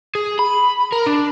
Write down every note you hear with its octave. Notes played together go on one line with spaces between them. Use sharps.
G#4
B5
A#4
D4